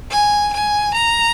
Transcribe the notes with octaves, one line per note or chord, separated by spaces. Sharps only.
G#5
G#5
A#5